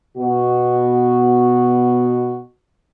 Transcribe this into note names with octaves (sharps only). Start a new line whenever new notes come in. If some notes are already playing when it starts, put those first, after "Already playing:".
B2 F#4